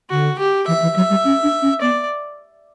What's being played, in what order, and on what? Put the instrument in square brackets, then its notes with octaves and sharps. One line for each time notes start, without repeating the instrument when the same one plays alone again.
[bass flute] D3 [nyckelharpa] F#4
[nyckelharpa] G4
[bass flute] E3 [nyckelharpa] E5
[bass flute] E3
[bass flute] F#3 [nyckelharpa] E5
[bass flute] G3
C#4
D4
C#4
[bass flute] B3 [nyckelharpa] D5